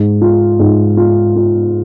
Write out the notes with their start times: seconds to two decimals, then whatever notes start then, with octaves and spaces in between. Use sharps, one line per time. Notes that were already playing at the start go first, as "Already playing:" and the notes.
Already playing: G#2
0.21 F4
0.59 G#2
0.97 F4
1.36 F4